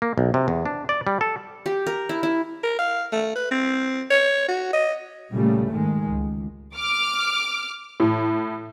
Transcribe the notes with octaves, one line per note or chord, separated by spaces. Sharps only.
A#3
B1
C3
E2
D4
D5
G3
A4
G4
A#4
E4
E4
A#4
F5
A3
B4
C4
C#5
F#4
D#5
A#2 C#3 G3 A3
G#2 D#3 G#3
C#2
D6 F6
A2